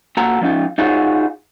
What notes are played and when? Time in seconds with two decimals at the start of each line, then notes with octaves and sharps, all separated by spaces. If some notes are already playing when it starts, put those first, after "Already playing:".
0.17 A#2 F#4 A4 A#5
0.41 F3 C#4 D#4 F4
0.78 D#4 F4 F#4 G#4 C#5